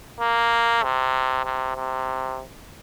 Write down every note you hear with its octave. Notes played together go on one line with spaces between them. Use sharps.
A#3
C3
C3
C3